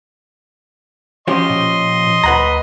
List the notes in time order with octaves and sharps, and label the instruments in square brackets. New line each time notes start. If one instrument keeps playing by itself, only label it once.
[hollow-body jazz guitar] F3 C#4 G4 [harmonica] D#5 C6
[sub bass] A#2
[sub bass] D2 [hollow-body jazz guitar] B4 F#5 A#5